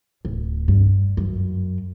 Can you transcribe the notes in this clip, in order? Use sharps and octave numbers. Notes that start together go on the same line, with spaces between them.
D1
G2
F#2